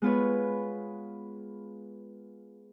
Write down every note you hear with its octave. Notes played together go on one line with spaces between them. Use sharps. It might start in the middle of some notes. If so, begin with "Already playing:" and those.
G#3 B3 F4 B4 C#5